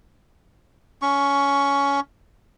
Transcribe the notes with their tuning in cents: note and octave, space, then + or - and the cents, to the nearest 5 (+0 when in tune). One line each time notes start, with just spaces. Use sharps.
C#4 +15 C#6 +10